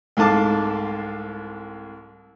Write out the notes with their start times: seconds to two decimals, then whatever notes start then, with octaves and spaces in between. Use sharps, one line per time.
0.17 C2 G#2 A3 F5 A5 D6